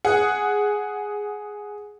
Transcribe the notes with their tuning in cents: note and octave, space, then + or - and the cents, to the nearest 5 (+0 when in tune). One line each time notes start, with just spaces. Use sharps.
G#4 +0 F#5 +0